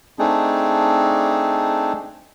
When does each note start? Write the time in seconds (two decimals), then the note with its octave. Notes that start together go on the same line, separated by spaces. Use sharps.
0.19 A3 C4 D4 D#4 G#4